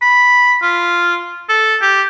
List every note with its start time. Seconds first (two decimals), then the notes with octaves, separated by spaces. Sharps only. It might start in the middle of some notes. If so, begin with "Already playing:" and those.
0.02 B5
0.62 F4
1.49 A4
1.82 G4